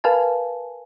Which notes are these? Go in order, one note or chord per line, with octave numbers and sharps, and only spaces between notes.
A#4 B4 F5 G#5 A5